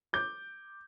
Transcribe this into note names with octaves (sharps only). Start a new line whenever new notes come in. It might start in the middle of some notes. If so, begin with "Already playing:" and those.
D6 G6